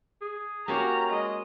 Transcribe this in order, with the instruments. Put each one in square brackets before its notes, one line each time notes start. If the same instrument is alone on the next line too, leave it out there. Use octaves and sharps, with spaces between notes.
[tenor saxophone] G#4
[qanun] A#3 C#4 F#4 [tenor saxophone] G4 [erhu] A#5
[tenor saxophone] G#3 [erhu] D#5